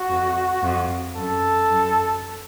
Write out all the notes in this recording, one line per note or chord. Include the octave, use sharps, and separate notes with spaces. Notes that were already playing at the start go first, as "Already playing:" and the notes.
Already playing: F#4
F2
F2
F#2 A4
F#2